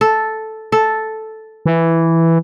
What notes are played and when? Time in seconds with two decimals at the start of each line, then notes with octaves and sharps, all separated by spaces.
0.01 A4
0.72 A4
1.66 E3